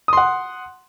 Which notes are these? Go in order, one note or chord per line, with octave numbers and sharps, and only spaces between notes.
F#5 C6 D#6